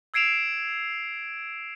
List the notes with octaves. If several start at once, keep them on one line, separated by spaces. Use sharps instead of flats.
E6 G#6 C7 D7 E7 F7